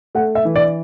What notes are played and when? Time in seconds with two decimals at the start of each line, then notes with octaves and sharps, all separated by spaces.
0.15 A3 F#5
0.35 E5
0.45 E3
0.56 D5